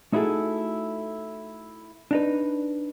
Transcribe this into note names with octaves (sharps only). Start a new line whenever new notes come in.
A3 D#4 E4 F#4 G#4 A4
D4 D#4 B4